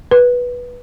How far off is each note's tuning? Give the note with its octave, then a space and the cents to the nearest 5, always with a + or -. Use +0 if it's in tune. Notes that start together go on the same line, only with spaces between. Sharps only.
B4 -10